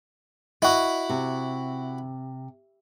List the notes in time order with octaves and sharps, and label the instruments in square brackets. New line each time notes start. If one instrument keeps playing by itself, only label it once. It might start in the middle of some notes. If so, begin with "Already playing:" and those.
[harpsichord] E4 F#4 [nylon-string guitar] D#5
[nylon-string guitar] C3